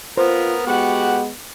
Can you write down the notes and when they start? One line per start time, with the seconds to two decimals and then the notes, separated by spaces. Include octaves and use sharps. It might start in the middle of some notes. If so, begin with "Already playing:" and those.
0.17 B3 F4 A#4 C5
0.67 G#3 B3 F#4 G4 F#5